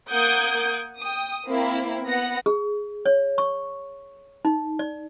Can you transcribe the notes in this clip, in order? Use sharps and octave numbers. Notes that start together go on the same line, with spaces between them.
A#3 F#5 D#6 G6 G#6 D7
G5 D#6
A#3 C4 E4
B3 F#5 A#6
G#4
C#5
C#6
D#4
D5